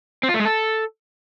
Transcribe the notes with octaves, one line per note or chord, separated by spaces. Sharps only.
C4
F4
A3
G#3
A4